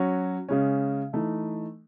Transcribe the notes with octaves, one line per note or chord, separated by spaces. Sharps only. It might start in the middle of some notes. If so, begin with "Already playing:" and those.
Already playing: F#3 C#4 F#4
C#3 G#3 C#4
E3 A3 D#4